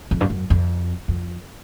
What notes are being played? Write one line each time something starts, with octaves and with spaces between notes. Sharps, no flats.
F2
G2
F#2
F2
F2